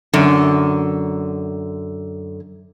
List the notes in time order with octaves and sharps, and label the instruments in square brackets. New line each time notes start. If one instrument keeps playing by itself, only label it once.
[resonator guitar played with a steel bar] F#2 D3